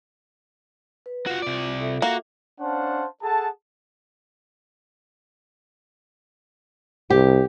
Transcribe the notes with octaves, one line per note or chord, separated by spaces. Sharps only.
B4
F4 F#4 F5
C3 D5
F4 A4 E5
A#3 F#4
C#4 D4 C5 F5 F#5 A5
G#4 A4 F#5 A5
C2 G4